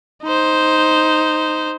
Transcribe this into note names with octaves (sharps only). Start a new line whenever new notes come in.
D#4 C5